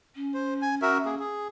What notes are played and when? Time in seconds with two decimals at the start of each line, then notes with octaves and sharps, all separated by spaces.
0.15 C#4
0.34 C5
0.62 G#5
0.82 F#4 A#4 E5
1.05 A#3 G#4
1.19 G#4